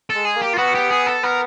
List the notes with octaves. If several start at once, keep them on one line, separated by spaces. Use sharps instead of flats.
A4
G#3
G#4
A#3
G4
F4
B3 F#4
G4
G#4
A4
B3 A#4